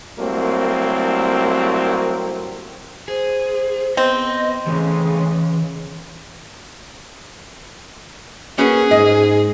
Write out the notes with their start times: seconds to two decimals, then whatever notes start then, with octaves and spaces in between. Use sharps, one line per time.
0.19 C2 F#3 A3 A#3 C4
3.08 G#4 C5
3.97 B3 C4 D#5
4.67 C#3 E3 G#3 A3
8.58 A#3 C#4 F#4 G#4 B4
8.91 G#2 D#5